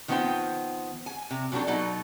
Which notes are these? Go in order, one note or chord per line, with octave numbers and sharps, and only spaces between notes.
D#3 F3 B3 C4 C5 G5
G#5
C3
B2 F#3 G3 D4 A4
B2 F#3 D#4 A4